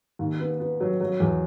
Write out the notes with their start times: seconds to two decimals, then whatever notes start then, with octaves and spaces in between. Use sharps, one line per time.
0.19 D#2
0.40 B3
0.60 B3
0.81 F#3
1.00 F#3
1.20 E2